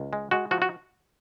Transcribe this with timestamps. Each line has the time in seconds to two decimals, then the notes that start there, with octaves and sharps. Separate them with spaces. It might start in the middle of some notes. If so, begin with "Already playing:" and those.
Already playing: C#2
0.13 G#3
0.31 G#3 F#4
0.51 F3 F#4
0.62 F#4